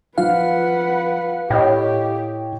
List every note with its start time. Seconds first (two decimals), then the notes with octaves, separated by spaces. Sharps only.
0.18 F3 B4 F5 F#5
1.50 A2 G4 C#5 D#5 G5